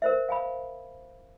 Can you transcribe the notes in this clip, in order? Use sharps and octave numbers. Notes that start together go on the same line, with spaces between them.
A#4 C5 E5
F5 G#5 B5